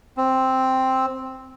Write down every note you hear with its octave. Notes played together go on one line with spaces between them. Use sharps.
C4